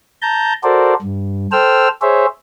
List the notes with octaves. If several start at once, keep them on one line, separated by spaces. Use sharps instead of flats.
A5 A#5 G6
F#4 A4 A#4 C5 D5
G2
A4 C5 G5 E6 F6
G#4 C5 C#5 E5